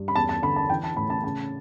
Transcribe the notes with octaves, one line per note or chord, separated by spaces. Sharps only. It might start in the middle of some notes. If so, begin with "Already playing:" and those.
Already playing: G2
B5
E2 A5
A5
D3 B5
A5
E3 G5
A5
A2 B5
A5
C#3 A5